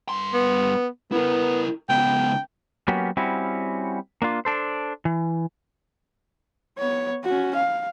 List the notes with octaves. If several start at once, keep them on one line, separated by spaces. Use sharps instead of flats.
G2 C6
B3
B3 E4 A#4
C#2 B3 G5
F#3 A#3 B3 C#4 F#4 G4
G3 C4 C#4 E4 F#4
A#3 D4 F4
D4 A4 C5
E3
B3 C#5
C#4 F#4
F5